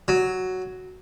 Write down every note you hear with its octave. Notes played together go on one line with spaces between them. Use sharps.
F#3